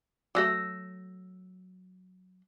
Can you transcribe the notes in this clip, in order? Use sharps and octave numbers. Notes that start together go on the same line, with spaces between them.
F#3 G3 A3 E6 A#6